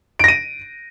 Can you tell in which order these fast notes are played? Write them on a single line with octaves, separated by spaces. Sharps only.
D7 A#6 D#7